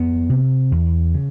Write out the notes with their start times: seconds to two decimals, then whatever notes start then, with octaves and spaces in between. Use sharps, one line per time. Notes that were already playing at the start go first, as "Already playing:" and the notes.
Already playing: F2 B3
0.30 C3
0.71 E2
1.14 C#3